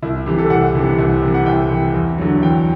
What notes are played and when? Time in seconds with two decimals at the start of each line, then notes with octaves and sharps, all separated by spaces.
0.02 C2 E4
0.26 C3 E3 G4
0.38 A4
0.50 C2 F#5
0.75 C3 E3
0.99 C2
1.22 C3 E3
1.34 F#5
1.46 C2 G5
1.70 C3 E3
1.94 E2
2.18 D3 F#3
2.42 E2 G5